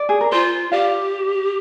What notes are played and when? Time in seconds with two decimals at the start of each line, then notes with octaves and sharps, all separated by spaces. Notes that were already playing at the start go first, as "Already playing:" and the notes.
Already playing: D5
0.09 G#4
0.21 A#4
0.32 F4 C5
0.72 G4 D5 F5